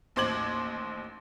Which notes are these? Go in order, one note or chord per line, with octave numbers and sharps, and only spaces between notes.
A1 D#2 C5 D6 G#6 F#7